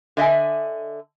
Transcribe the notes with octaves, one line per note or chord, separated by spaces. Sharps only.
D3 D#5 E5 G#5